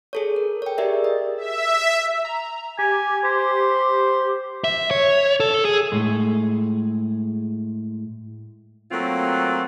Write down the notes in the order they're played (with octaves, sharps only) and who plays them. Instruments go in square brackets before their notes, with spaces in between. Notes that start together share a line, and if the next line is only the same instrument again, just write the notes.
[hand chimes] G#4 A4 C#5
A#4
C#5 G5
G4 G#4 A#4 D5 E5
D#5
[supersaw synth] E5
[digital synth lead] A#5
[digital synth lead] G4 [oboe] G#5
[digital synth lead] G4 [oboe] C5
[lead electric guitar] E5
C#5
A4
G#4
[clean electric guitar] A2 G#3
[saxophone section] F#3 A3 A#3 C4 F4